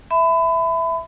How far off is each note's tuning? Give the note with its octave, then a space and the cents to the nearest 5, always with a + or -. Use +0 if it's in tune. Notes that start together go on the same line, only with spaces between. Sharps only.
E5 +0 B5 +30